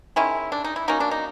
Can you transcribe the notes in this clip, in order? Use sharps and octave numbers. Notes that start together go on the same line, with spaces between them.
D#3 G#3 C#4 E4
D4
D#4
E4
F#3 A#3 C#4 D#4
D4
D#4